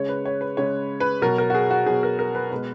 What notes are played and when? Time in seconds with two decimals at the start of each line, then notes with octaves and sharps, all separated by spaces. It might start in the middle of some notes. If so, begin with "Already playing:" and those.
Already playing: C#3 G#3 C#5
0.09 B4
0.25 C#5
0.41 B4
0.57 C#3 G#3 C#5
1.00 B4
1.22 B2 F#3 A#4
1.38 A#4
1.50 F#4
1.55 G#4
1.70 F#4
1.86 B2 F#3 G#4
2.03 A#4
2.19 A#4
2.35 B4
2.51 B2 G#3 B4